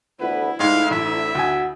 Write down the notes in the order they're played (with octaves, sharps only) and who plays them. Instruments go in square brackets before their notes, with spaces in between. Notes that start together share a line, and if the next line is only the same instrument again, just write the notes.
[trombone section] A1 D2 B3 [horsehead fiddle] E4 [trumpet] B4
[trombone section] D2 [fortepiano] G#2 G#3 [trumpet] F5
[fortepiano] A1 [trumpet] E5
[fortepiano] D2 G#5 [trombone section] F#4